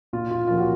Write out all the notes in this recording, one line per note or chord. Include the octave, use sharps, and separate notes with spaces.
A#2 F4
F4
F3 A#3 C#4 F4
F#4